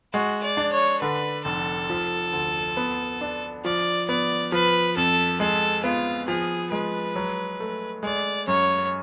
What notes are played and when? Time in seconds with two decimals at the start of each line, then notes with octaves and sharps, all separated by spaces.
0.13 G#3 F#4
0.43 D5
0.57 D4
0.72 C#5
1.01 D3 B4
1.45 F1 A4
1.90 F3
2.33 D2
2.77 B3
3.21 D4
3.65 F3 D5
4.09 B3 D5
4.52 F3 B4
4.97 F2 A4
5.40 G#3 A4
5.84 B3 F4
6.28 F3 G#4
6.71 G#3 B4
7.16 F#3
7.60 A3
8.03 G#3 D5
8.47 F#2 C#5